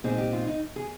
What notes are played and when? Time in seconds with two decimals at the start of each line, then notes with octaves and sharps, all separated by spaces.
0.04 A#2 G#3 C4 D#4 G#4
0.18 G4
0.33 F4
0.47 D#4
0.76 G#4